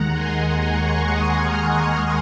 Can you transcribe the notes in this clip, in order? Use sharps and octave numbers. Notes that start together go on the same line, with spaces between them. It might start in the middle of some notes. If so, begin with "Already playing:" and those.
Already playing: D#2 D#3 G#3 F#5 A#5
G#5 C6
A#5 C#6
C6 D#6
C#6 F6